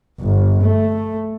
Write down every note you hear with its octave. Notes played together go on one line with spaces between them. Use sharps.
G1
A3